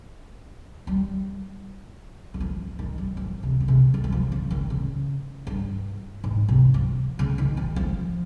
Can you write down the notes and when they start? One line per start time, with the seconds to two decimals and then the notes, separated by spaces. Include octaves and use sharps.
0.87 G3
2.34 D#3
2.40 F3
2.79 D#3
2.98 G3
3.17 F3
3.43 C3
3.60 C#3
3.68 C3
3.94 D#3
4.04 G3
4.12 F3
4.32 C#3
4.51 D#3
4.70 C#3
5.47 G2
6.24 G#2
6.49 C3
6.74 F3
7.19 C#3
7.38 D#3
7.57 F3
7.76 F3